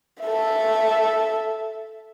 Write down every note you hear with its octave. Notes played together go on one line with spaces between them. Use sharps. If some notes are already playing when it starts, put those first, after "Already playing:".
A4 E5